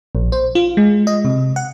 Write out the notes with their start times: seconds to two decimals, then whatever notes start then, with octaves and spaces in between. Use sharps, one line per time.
0.15 A#1
0.32 C5
0.55 F4
0.77 G#3
1.07 D#5
1.25 C3
1.56 F#5